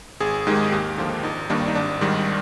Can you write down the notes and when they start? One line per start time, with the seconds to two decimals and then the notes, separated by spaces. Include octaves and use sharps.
0.20 G#1 G#4
0.47 G#2 D#3 G#3 G4
0.72 D#2 G4
0.97 D3 F3 A#3 F4
1.23 G#1 D#4
1.50 G2 D#3 G3 A#3 D4
1.68 D#4
1.75 G#1 D4
2.01 G#2 D#3 G3